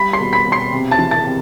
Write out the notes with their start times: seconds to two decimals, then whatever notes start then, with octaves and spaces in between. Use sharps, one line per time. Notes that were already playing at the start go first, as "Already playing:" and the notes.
Already playing: G3 B5 B6
0.13 C6 C7
0.20 B2
0.33 B5 B6
0.47 B2
0.52 C6 C7
0.72 C3
0.91 A5 A6
0.98 E3
1.11 A5 A6
1.24 C3